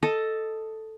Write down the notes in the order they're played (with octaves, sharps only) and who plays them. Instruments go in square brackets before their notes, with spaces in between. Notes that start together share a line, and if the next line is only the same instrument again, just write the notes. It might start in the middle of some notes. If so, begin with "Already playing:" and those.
[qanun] A4 D#5